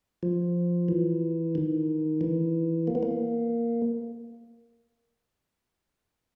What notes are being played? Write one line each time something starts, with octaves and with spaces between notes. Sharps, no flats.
F3
E3
D#3
E3
A#3
B3
A#3